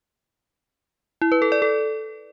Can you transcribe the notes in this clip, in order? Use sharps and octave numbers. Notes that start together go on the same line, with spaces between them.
E4
B4
A4
D5
A4